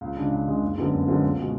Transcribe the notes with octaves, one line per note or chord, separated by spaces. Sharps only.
C#2
C#3 G#3 D4
C#2
C#3 G#3 D4
F#1
F#2 D3 G#3 B3
F#1
F#2 D3 G#3 B3
C#2
B2 G#3